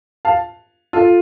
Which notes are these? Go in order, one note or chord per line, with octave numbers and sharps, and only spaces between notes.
F5 A5
F4 A4